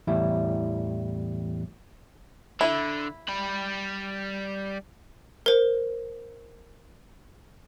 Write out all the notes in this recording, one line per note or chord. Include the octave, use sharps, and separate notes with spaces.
E2 A2 E3 G3 E4
D3 E4
G3 B5
A#4 C5